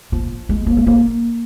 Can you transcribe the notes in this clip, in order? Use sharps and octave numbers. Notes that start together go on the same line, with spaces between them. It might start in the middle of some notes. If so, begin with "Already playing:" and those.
F3
G#3
A#3
G#3
A#3